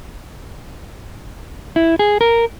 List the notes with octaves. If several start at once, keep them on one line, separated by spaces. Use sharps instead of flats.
E4
G#4
A#4